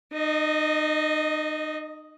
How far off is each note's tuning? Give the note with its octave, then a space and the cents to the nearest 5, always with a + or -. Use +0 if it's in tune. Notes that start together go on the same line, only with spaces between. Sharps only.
D#4 -35 D#5 +5